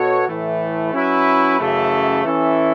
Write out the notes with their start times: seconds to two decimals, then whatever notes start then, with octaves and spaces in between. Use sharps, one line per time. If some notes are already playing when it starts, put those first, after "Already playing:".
Already playing: B2 B3 F#4 A4 C#5
0.27 A2 E3 A3
0.93 F#3 C#4 E4 B4 E5
1.59 F#2 C#3 E3 A3
2.25 E3 C#4 E4 A4 E5